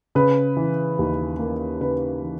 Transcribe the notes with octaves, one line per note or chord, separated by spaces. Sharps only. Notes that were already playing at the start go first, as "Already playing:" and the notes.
C#3 B4
E3
D#2
A#3
C#3 B4
E3